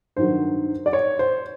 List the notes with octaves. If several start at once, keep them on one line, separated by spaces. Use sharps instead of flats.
G2 D#3 F#3 C5
D5
C#5
C5